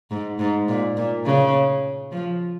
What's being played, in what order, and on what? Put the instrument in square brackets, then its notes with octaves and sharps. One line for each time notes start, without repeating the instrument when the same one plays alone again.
[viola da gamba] G#2
G#2
A#2
A#2
C#3
F3